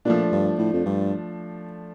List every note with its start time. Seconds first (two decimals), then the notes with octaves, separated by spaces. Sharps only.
0.05 A#2 F3 A3 D4
0.32 G2
0.59 A2
0.73 F2
0.86 G2